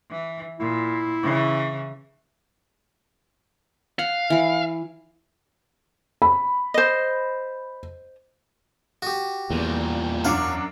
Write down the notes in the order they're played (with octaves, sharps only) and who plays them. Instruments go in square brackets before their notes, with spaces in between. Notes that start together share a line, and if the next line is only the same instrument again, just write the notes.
[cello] E3
[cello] A#2 [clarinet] E4
[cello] C#3 E3
[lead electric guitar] F5 [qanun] F#5
[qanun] E3 B5
[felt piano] B5
[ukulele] C5 D#5
[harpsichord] F#4 G4
[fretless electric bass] E2 [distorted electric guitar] A#2 G3
[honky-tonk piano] F#2 D4 D6 [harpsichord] C#5 F5 F#5